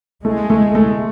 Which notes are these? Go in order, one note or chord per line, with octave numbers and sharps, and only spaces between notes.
G#3 A3
A3
A3